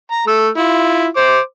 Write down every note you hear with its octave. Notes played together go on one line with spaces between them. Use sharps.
A#5
A3 E6
E4 F4
C5 D6